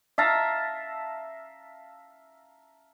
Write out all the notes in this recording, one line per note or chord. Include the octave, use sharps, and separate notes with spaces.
E5 F5 A5 A#5